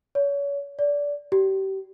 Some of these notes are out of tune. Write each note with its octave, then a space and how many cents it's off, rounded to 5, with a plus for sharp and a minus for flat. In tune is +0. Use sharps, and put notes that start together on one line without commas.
C#5 +35
D5 -20
G4 -30